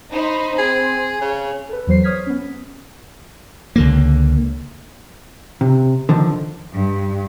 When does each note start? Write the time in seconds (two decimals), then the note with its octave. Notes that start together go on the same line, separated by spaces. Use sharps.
0.12 D#4 C5 B5
0.58 C4 G#4
1.21 C#3 C#5
1.69 A4 B4
1.87 E2 F#3 C5 C7
2.03 C#5 D#6 F6 G#6 B6
2.26 B3 C#4
3.76 C#2 D3 A#3
5.61 C3
6.09 D3 D#3 F3
6.73 G2